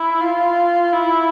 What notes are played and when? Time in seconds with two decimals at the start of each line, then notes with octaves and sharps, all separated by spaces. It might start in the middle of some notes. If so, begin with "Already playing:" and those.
Already playing: E4
0.20 F4
0.93 E4